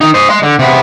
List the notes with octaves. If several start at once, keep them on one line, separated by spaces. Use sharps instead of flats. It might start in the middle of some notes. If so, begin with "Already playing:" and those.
D#3 D#4
C5 D#5
D#5 C6
D3
C3 B3